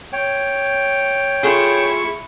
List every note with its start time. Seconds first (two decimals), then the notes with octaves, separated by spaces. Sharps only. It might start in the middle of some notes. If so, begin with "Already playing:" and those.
0.13 C#5 G5
1.43 A3 E4 F4 G#4 C#6